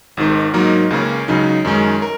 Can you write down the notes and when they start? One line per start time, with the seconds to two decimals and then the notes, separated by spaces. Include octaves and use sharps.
0.17 G#1 G#2 D#3
0.53 G#2 F#3 A#3 D#4 A#4
0.90 C#2 C#3 A#3 C#4
1.28 C#2 C#3 F#3 D#4
1.65 F#2 D#3 G#3 C#4 A#4
2.02 A#4